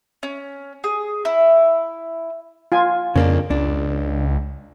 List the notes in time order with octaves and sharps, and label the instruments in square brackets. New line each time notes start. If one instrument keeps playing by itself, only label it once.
[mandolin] C#4
G#4
E4
[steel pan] F4 G#5
[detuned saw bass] F2 [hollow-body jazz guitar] C#3 A#3 D4
[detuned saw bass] C#2 [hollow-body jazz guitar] D4